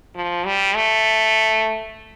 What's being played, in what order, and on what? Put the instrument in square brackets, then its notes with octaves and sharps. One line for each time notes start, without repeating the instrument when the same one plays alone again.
[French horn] F3
G3
A3